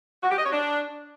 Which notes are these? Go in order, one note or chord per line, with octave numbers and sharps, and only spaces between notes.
F#4
G4
D#5
C#5
D4